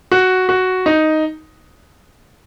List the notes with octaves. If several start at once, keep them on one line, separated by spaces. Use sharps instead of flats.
F#4
F#4
D#4